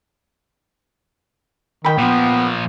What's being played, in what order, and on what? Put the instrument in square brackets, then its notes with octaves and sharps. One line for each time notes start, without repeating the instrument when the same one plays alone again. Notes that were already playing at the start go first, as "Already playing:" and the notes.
[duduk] D#3 [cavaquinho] G5 B5
[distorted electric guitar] A#2 F3 [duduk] B3